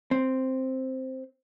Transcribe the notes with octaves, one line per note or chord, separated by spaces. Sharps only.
C4